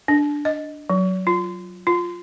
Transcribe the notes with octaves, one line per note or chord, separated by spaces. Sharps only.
D4
D#5
F#3
F4
F4